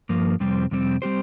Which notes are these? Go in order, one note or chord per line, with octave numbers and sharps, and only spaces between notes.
G2 F3 A#3
F2 C3 G3 C4
F2 C3 G3 C4
G3 C4 G4 C5